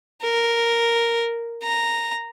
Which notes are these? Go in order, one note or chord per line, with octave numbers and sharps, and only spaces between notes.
A#4
A#5